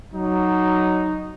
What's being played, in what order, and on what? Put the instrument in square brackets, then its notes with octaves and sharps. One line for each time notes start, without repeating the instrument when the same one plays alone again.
[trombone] F#3 [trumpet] D#4